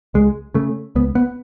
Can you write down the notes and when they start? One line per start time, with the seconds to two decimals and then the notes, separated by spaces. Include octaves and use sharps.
0.14 C#2 G#3
0.54 C#3 A3
0.96 C#2 B3
1.15 B3